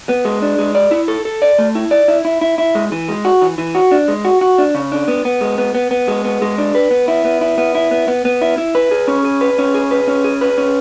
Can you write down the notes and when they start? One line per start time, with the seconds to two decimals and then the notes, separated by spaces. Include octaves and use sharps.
0.09 B3
0.25 G#3
0.42 D4
0.58 G#3
0.75 D5
0.91 E4
1.08 A4
1.25 A4
1.42 D5
1.59 A3
1.75 E4
1.91 D5
2.08 E4
2.25 E4
2.41 E4
2.58 E4
2.75 G#3
2.92 E3
3.09 G#3
3.25 F#4
3.41 E3
3.58 E3
3.75 F#4
3.91 D4
4.08 G#3
4.25 F#4
4.41 F#4
4.58 D4
4.75 C#3
4.92 D4
5.08 B3
5.25 B3
5.41 G#3
5.58 B3
5.75 B3
5.91 B3
6.08 G#3
6.25 B3
6.42 G#3
6.58 D4
6.75 B4
6.91 B3
7.08 E4
7.25 B3
7.41 E4
7.58 B3
7.75 E4
7.91 B3
8.08 B3
8.25 B3
8.41 E4
8.58 E4
8.75 B4
8.91 G#4
9.08 C#4
9.24 G#4
9.41 B4
9.58 C#4
9.74 G#4
9.91 B4
10.08 C#4
10.24 G#4
10.41 B4
10.58 C#4